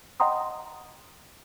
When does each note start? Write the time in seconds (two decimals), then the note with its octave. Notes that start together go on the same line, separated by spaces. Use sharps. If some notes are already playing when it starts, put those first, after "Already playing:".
0.20 D#5 F#5 G5 A#5 C6 D#6